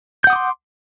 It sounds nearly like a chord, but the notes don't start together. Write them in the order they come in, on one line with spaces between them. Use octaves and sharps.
G6 F#5 D#6 D6 C6